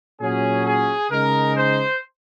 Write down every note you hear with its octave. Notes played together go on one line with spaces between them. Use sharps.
A#2 F#3 C#4 G#4
G#4
C#3 G#3 D#4 A#4
C5